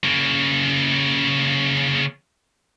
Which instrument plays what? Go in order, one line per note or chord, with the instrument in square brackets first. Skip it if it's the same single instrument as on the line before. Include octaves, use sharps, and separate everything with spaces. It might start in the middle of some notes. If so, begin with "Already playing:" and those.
[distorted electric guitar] C#3 A#3